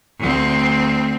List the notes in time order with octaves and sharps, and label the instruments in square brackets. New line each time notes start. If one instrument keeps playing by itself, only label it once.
[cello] D2 C4